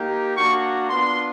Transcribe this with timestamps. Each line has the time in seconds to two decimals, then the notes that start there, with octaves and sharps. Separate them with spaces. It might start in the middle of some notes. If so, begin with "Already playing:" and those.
Already playing: A#3 D#4 G4
0.36 A#3 D4 F#4 C#6
0.90 B3 D4 F4 C6